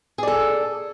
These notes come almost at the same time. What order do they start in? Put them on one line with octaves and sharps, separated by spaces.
G#4 D5 A4